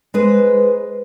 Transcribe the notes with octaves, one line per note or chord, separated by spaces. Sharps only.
G#3 G#4 B4 C5